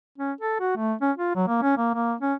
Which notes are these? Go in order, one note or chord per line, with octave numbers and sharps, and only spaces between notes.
C#4
A4
F#4
A3
C#4
F4
F#3
A#3
C#4
A#3
A#3
C#4